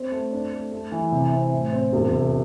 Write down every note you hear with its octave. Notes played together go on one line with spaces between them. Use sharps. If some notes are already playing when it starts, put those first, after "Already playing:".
Already playing: C4
A3
D4
A3
A3
E3
C3
C4
A2
C4
E1
C3